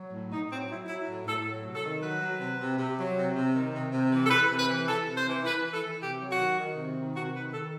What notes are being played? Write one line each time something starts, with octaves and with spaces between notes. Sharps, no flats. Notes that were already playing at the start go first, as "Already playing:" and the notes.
Already playing: F#3
A2
A2 D#4
F#3 C4
F#3 E4
F#3 E4
A2
A2 A4
F#3
C3
A4
D#3
F#3 B4
F#3
C3
C3
C3
F#3
C3
C3
D#3
C3
C3
E3
A4
E3 B4
C3
B4
E3
E3 A4
C3
C5
E3
E3 B4
E3
A4
E3
C3 G4
F#3
F#4
D#3
D#3
C3
D#3
C3 F#4
D#3 B4
D#3 A4